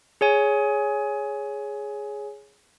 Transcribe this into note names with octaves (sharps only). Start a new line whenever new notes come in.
G#4 C#5 G#5